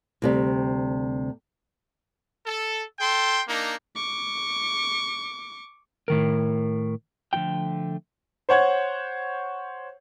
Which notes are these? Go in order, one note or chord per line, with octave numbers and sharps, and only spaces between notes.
D2 C3 G3
A4
A4 G5 C6
A#3 D4 D#4
C#6 D6
A2 D#3 A#4
D3 F3 A3 F4 G5
C5 C#5 F#5 G#6